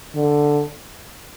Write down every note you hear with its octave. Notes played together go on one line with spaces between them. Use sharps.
D3